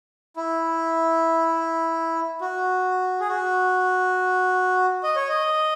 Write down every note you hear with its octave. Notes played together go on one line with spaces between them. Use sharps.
E4
F#4
G#4
F#4
D#5
C#5
D#5